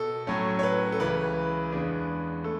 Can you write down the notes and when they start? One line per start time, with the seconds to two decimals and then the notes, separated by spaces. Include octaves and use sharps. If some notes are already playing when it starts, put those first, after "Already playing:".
Already playing: B2 A4
0.27 A2 F#3 A3 C#4
0.59 C#5
0.63 B4
0.92 A4
1.00 C#2 C#3 E3 B4
1.72 E2 C#3 G#3 B3 D4
2.44 A3 A4